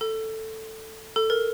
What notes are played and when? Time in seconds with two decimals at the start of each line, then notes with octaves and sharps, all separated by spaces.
0.01 A4
1.16 A4
1.30 A#4